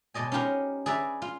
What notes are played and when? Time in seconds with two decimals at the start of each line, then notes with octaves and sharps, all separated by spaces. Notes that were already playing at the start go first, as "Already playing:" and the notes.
0.14 B2 G#3 D5 D#5 G#5
0.32 C#4 D#4 F4 G4 A#4 C5
0.86 G#4 B4 D5 E5 A#5
1.22 F4